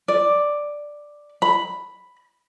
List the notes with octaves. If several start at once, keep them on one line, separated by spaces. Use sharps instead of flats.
D5
B5